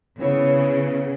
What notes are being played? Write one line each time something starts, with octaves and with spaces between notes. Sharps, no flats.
C#3 B3 E4 C#5